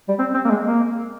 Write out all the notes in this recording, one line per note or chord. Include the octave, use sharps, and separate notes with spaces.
G3
C4
C4
A#3
G#3
A#3